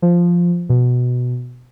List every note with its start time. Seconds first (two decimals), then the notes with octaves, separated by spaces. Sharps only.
0.02 F3
0.69 B2